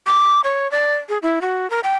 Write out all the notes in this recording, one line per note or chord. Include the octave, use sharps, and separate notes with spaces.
D6
C#5
D5
G#4
E4
F#4
A#4
G5